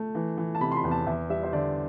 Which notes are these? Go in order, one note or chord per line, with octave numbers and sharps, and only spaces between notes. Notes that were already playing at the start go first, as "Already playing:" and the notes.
Already playing: A3
E3
E3
A5
C3 B5
C6
B5
E2
A5
E2 E5
G3 E5
C5
D3 D5